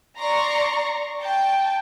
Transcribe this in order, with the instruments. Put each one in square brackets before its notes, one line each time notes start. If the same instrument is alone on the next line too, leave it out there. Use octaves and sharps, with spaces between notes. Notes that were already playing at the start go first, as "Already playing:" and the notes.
[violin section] D5 A#5 C6 C#6
G5 A5